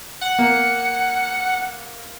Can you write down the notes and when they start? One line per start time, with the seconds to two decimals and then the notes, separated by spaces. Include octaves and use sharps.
0.21 F#5
0.39 A#3